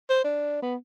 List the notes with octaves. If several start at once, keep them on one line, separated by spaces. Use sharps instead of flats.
C5
D4
B3